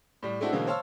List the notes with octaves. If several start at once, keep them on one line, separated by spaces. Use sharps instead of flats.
A2 G3
G#3 A3 C4 D4 E4 F#4
B2 D3 E3 G#3 A#3 C4
C5 C#5 F5 A5 E6